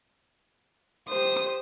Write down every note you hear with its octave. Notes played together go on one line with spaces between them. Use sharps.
G4 C5 D#6